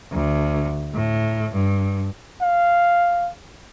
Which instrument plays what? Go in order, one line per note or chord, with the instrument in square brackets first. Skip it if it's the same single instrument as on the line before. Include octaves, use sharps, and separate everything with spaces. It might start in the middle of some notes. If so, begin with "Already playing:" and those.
[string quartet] D2
A2
G2
[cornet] F5